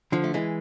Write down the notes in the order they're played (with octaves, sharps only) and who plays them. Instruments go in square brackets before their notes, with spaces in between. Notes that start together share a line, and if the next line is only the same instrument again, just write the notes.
[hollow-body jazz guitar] D3 F3
A3
E3 G#3